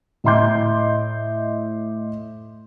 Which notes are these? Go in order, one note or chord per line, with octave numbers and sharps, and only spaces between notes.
A2 D#5 E5 C6 D6 G6